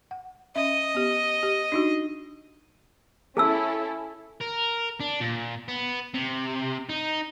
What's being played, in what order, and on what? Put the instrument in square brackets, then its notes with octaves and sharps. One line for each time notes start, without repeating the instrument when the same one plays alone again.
[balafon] F#5
[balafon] C#4 E5 [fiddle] D#5
[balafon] B3 G4
G4
D4 D#4 F#4
[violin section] C#4 E4 A4 [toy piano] G#4 A5 E6
[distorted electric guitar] A#4
D4
A#2
B3
C3
D#4